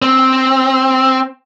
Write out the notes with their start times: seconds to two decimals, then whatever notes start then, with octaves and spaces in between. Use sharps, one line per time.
0.02 C4